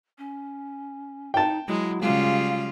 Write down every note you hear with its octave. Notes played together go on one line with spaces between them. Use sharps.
C#4
D#4 G5 A5
F#3 G#3 E4
C#3 G3 G#3 F4 F5